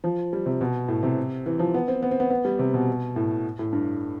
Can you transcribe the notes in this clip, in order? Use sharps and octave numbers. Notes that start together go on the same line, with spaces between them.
F3
G3
C3
B2
A2
C3
E3
F3
B3
C4
B3
C4
B3
B3
G3
C3
B2
A2
A2
G2